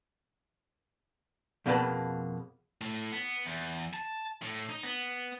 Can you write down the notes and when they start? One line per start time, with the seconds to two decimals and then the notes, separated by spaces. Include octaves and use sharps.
1.66 F2 B2 A#3 G#4 B4 A5
2.81 A2
3.12 B3
3.46 E2
3.94 A5
4.42 A2
4.70 D#4
4.83 B3